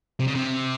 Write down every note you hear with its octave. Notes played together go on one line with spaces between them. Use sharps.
C3
C#3
C3